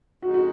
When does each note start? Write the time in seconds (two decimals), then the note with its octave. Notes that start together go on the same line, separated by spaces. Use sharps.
0.22 F2 C#3 G#3 D#4 F#4
0.34 F#4